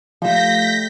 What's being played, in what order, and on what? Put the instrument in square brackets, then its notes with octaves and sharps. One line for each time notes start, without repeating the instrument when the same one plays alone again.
[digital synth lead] F3 [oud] G3 A3 [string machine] G6 A#6 B6